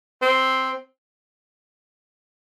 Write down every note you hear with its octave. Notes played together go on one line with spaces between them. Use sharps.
C4